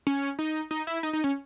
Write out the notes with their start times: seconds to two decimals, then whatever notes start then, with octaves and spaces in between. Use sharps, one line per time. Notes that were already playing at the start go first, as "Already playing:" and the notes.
0.07 C#4
0.39 D#4
0.71 D#4
0.87 E4
1.03 D#4
1.13 D#4
1.24 C#4